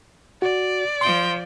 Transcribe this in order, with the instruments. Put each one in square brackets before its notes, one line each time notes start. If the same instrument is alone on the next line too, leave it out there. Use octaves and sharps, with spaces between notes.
[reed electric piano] F#4 [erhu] D5
[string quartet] F3 G5 [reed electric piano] C6